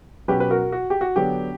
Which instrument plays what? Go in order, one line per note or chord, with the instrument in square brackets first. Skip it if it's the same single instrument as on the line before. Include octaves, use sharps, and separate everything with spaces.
[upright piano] B2 F#3 C#4 G4 B4
B4
F#4 A#4
F#4
G4
F#4
D3 F#3 B3 D4 G4